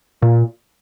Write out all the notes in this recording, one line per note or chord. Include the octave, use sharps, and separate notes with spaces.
A#2